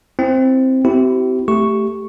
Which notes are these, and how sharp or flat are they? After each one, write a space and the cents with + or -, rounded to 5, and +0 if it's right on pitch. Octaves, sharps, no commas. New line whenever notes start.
C4 +0 E4 +0
C4 -30 E4 +0 G4 -40
A3 +0 G4 +0 C#6 +0